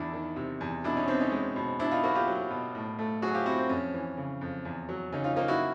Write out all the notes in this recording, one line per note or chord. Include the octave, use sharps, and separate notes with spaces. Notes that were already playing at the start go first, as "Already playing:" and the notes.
Already playing: E2 D4 E4
D#3
C3
E2
B2 D4 E4
C#4 D#4
B3 C4 D4
C#4 D#4
G#3
B2
B2 D4 E4
D#4 F4
A#3 E4 F#4
F4 G4
F#3
B2
A2
A3
F#3 F#4 G#4
F4 G4
C4 E4 F#4
C4
F2 C#4
E3
C#3
F2
E2
F#3
C#3 C#4 D#4
D#4 F4
A#3 D#4 F4
E4 F#4